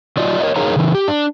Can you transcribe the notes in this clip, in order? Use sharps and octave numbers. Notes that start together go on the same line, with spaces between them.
F#3 F4 D5 D#5
A#4 C#5 D#5
D#4 G#4 A#4 C#5 F5 A#5
C#3 E3
G4
D4